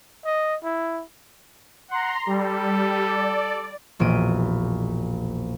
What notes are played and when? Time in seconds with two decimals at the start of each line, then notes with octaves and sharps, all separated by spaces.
0.25 D#5
0.64 E4
1.91 F#5 A#5 C6
2.26 G3 A4
3.07 D5
3.99 E1 A#1 A#2 D7 D#7